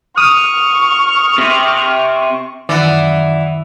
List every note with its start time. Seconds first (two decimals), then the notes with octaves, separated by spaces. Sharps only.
0.17 C#6 D#6 F6
1.38 C3
2.69 F#2 D#3 E3 D5 E5 F#5